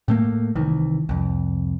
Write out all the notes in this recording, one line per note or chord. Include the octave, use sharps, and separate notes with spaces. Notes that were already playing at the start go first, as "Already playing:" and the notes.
A2 A3 A#3
C2 D#3 E3
C2 F2